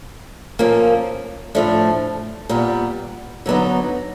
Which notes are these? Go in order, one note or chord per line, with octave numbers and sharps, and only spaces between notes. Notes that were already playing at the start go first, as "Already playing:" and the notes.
A#2 F3 A#3 C#4
A2 F3 A3 D4
A#2 G3 B3
D3 F#3 B3 D#4